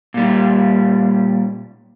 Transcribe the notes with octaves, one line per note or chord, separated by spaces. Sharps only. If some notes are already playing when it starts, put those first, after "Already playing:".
A#2 G3